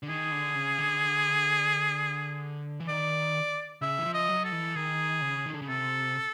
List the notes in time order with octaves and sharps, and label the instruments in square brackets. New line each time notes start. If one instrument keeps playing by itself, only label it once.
[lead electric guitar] D3
[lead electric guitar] D#3 [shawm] G#4
[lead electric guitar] D3
C#3
D3
E3
[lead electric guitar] D#3 [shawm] D5
[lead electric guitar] C#3 [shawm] E5
[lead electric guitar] E3
F3
[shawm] D#5
[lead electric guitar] F#3
[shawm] A4
[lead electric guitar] E3
[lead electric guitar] D#3 [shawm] G#4
[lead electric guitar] C#3
D#3
D3
C#3
[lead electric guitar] C3 [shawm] A4